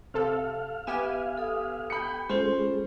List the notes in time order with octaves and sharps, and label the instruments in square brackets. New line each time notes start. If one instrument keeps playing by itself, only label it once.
[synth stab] C3 A4 [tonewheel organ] F5
[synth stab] B3 G4 G#5 [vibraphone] E5
[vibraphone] A4 D#6
[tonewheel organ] G5 [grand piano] B5 C#7
[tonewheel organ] G#3 [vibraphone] C#4 F4 A4 [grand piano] C5